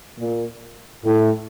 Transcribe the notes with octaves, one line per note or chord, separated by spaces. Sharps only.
A#2
A2